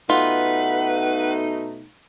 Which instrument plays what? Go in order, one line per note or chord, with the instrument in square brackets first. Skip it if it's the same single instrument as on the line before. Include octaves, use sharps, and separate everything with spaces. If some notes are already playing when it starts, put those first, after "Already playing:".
[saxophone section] B2 A3 D#4 [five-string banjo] F4 [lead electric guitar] B4 [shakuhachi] F#5